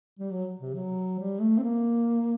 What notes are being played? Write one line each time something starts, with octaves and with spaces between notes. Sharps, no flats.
G3
F#3
C3
F#3
G3
A3
C4
A#3